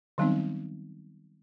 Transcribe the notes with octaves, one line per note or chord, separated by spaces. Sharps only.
D#3 F#3 G3 B3 C4 D#4